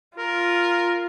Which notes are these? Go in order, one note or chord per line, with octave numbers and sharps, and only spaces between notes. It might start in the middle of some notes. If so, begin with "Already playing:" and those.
F4 A#4